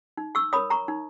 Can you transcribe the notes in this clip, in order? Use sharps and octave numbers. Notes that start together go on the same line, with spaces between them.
D#4
C#6 E6
A#4 C#5 B5 D#6
A#5 C#6
D#4